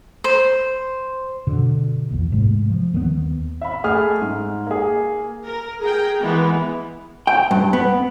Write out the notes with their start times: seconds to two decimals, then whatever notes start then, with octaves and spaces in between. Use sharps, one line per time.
0.24 C5
1.47 G2 B2 D3
2.11 A#1 E2
2.32 G#2 C3 G#3 A3
2.70 F3
2.93 D#2 D#3 E3 B3
3.61 E5 F5 B5
3.84 A3 G#4 A4 D#6 F6
4.22 G#2
4.67 A#3 G#4
5.45 A#4
5.81 G#4 A#4 G5
6.21 E3 G#3 B3
7.27 G5
7.51 G2
7.73 B3